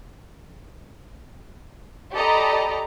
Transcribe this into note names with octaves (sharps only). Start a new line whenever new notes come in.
G4 A4 D5 D#5 A#5 B5